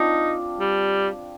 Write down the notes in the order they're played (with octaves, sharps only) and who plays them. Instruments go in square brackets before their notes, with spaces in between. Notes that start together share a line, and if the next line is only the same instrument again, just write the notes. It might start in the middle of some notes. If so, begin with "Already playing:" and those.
Already playing: [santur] C4 D4 F4 [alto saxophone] D#4
[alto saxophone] G3